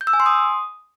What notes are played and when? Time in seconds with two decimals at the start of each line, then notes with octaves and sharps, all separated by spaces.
0.01 G6
0.07 E6
0.13 G#5
0.20 C6
0.26 D#6